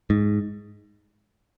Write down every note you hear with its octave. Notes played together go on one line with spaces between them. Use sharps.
G#2